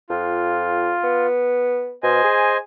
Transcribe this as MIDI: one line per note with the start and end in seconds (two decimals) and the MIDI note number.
0.10 0.94 41
0.10 1.27 65
1.04 1.94 59
2.03 2.23 47
2.03 2.57 72
2.03 2.57 75
2.03 2.57 80
2.24 2.59 68